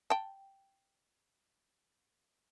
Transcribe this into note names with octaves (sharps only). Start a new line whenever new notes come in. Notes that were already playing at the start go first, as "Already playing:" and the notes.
G5 A5